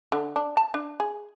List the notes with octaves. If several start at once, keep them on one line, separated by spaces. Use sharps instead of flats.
D3
D4
A5
D4
G#4